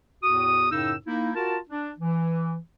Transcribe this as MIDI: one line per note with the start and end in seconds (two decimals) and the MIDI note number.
0.23 0.67 40
0.23 0.67 45
0.23 0.67 66
0.23 0.67 87
0.71 0.94 42
0.71 0.94 45
0.71 0.94 49
0.71 0.94 63
0.71 0.94 88
1.07 1.30 58
1.07 1.30 63
1.07 1.30 64
1.35 1.57 65
1.35 1.57 66
1.35 1.57 70
1.35 1.57 81
1.69 1.91 62
1.99 2.55 52